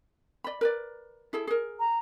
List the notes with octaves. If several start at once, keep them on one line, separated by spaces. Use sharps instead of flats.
D5 B5
A#4 B4 D5
E4 G#4 A4
G#4 A#4
A#5